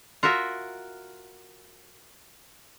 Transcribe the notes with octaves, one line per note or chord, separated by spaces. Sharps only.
F4 F#4 A#4 E5